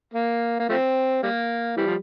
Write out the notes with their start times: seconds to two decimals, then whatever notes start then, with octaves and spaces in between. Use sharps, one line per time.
0.14 A#3
0.59 A#3
0.69 F3 A3 C4
1.23 G3 A#3
1.77 E3 G3
1.86 F3